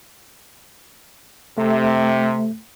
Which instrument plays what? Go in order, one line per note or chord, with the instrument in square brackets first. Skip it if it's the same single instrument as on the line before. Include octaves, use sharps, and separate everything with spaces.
[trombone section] C3 [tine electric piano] A3